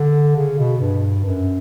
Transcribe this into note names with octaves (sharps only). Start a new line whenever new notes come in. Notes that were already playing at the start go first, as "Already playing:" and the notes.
Already playing: D3
C#3
B2
G2
F#2